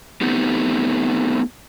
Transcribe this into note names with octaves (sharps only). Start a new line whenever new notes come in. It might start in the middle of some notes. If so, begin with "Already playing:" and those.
A3 B3 C4 D#4 G4